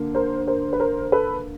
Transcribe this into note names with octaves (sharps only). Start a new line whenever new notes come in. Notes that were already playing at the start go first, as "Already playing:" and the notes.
Already playing: D3 A#3
A#4 C5
A#4 C5
B4
A#4 C5
A4 B4